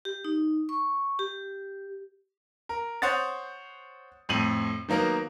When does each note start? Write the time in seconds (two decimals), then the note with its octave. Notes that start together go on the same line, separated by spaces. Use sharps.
0.05 G4
0.24 D#4
0.69 C#6
1.19 G4
2.69 A#4
3.02 C5 C#5 F#5 D#6 A6
4.29 F2 A2 D#7 F#7
4.89 D#3 F#3 A#3 B3 A#4